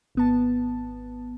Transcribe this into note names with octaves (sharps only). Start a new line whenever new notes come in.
G#1 B3 A5